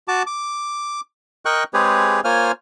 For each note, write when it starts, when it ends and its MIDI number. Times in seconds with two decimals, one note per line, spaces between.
0.08 0.23 66
0.08 0.23 81
0.08 0.23 86
0.27 1.01 86
1.45 1.64 70
1.45 1.64 75
1.45 1.64 79
1.45 1.64 85
1.45 1.64 90
1.74 2.20 56
1.74 2.20 60
1.74 2.20 67
1.74 2.20 68
1.74 2.20 71
1.74 2.20 73
2.24 2.52 58
2.24 2.52 65
2.24 2.52 72
2.24 2.52 73
2.24 2.52 80
2.24 2.52 89